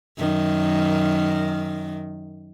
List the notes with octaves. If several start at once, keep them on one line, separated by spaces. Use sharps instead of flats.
F#2 D#3